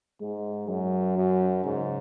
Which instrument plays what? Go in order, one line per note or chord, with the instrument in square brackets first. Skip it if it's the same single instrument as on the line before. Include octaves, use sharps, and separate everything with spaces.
[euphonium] G#2 [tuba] G#3
[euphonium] F#2 [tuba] F#3
[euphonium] F#2
[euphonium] G#2 [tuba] C#3